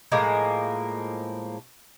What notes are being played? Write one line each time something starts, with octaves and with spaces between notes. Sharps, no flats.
A2 F3 G#3 A#3